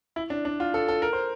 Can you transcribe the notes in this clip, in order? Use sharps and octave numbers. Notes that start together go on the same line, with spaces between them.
E4
D4
D4
F4
A4
A4
A#4
C5